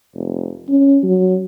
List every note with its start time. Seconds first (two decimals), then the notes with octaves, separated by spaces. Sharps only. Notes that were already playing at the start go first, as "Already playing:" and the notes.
0.14 F1
0.69 C#4
1.03 F#3